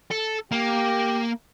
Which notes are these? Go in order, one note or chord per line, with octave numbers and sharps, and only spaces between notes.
A4
A#3 G4